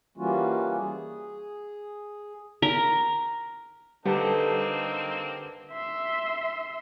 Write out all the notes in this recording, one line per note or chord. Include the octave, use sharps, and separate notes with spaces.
E3 G3 A#3 C#4 F4 F#4
G#4
A#4
D3 G3 A#3 C4 D#4 G4 B4 A5
E5 C6